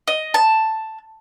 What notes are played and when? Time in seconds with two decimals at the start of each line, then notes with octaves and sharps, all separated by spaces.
0.08 D#5
0.34 A5